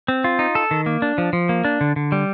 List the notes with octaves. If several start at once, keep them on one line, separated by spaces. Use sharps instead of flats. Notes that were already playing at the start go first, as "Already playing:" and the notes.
C4
F4
D#4
A4
D#3
A#3
D4
F3
F3
A#3
D4
D3
D3
G3